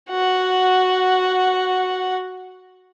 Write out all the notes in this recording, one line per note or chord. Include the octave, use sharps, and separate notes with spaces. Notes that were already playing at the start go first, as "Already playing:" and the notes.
F#4 F#5